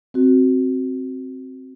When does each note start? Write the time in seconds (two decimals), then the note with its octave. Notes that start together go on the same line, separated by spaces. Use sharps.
0.14 C4 F#4